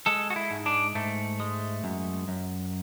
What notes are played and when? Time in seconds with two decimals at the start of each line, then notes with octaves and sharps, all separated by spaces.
0.06 G#3 A4
0.30 F#4
0.36 E4
0.51 G#2
0.66 D4
0.95 G#2 A3
1.40 G#3
1.84 F#2
2.28 F#2